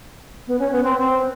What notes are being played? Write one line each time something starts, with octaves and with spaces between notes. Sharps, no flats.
B3
C#4
B3
C4
C4